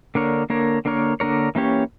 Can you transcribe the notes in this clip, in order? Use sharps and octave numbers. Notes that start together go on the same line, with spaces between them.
D3 A#3 D4 A#4 C#5
D3 A#3 D4 A#4 C#5
D3 A#3 D4 A#4 C#5
D3 A#3 D4 A#4 C#5
E3 A#3 C#4 G4 C#5